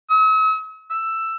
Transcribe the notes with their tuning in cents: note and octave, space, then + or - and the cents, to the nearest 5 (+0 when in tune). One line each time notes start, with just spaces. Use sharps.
E6 -45
E6 +10